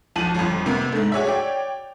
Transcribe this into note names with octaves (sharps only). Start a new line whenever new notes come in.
B1 F3 A5 D#7 F#7
G1 F2
C3 A#3 B3
G#2 A3
F#4 G#4 C#5 D5 E5
C#5 D5 G5